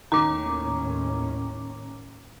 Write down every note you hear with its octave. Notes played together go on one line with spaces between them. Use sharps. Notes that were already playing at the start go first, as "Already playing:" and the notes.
D#2 A2 D#3 C#4 A#5 D6